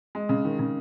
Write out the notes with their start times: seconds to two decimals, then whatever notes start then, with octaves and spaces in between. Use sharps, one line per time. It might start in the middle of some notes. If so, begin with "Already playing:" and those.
0.15 G#3
0.29 C#3
0.45 D#3
0.59 C#3